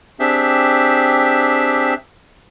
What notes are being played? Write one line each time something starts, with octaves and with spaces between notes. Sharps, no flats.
C4 D4 G4 G#4 E5